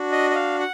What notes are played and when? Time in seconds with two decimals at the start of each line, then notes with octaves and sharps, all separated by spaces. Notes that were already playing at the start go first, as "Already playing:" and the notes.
Already playing: D4 F#4
0.12 D#5
0.30 D#5
0.35 F5
0.59 F#5